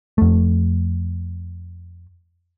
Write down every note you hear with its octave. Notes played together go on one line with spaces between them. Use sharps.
F2 A3